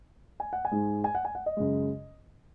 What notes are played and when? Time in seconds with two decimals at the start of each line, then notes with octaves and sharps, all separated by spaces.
0.40 G#5
0.53 F#5
0.65 G#5
0.71 G#2 G#3
1.04 G#5
1.15 F#5
1.25 G#5
1.35 F#5
1.46 D#5
1.57 F#2 C#3 G#3